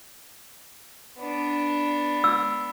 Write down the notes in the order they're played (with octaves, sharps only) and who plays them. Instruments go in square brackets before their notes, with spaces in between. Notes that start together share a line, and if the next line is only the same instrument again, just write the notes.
[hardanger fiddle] B3 D4
[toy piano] E6